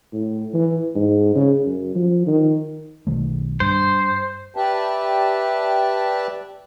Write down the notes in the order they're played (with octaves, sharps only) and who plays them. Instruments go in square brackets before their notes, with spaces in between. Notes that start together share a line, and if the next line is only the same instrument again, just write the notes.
[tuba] A2
E3
G#2
C#3
F#2
F3
D#3
[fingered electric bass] B1 D#3 A3
[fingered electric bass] G2 [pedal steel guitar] C5
[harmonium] G4 B4 D5 E5 G5 A5